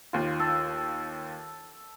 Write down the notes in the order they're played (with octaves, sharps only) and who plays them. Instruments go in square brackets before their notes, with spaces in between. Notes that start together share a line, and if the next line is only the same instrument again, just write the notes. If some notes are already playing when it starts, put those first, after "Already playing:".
[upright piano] D#2 F4
[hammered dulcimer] A4